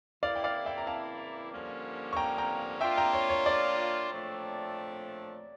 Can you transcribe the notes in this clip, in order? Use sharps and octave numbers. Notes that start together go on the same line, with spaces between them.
C#3 E3 A#3 E4 D5 F5
G5
D5 F5
E5 G5
A#5
F5 A5
G2 D3 F3 A#3 C#4
C#6
G5 A#5
G5 A#5
A#3 D4 F4 E5 G5
G5 A#5
C#5
C#5
D5
A#2 F3 A3 D4 F4